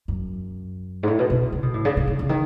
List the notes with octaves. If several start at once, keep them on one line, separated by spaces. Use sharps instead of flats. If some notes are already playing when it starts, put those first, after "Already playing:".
F#2
G#2
A2
B2
B2
C#3
B2
A2
C#3
C#3
C#3
C#3
D#3